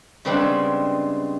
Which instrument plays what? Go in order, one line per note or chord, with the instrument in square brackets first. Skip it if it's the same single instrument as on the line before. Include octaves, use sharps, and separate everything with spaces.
[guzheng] C#3 G3 G#3 B3 C4 D4